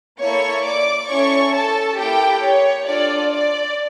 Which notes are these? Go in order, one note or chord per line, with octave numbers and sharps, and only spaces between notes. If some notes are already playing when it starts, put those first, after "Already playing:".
A#3 E4 A4 C#5 C#6
D5 D6
C#4 E4 A4 C#5 C#6
A4 A5
A#3 E4 G4 A4 G5
C#5
D4 F4 A4 D5
D5